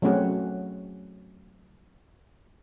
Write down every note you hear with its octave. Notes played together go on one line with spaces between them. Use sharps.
F#3 A3 C4 C#4 F#4 G#4